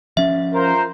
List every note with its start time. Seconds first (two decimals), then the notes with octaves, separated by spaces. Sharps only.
0.17 F3 C#4 E5
0.54 F4 A#4 C5